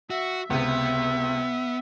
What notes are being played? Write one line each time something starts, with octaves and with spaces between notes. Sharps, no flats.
F#4 E5
C#2 C3 B3 E5